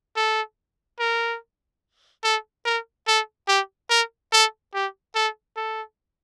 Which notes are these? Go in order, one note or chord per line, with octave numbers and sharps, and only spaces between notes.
A4
A#4
A4
A#4
A4
G4
A#4
A4
G4
A4
A4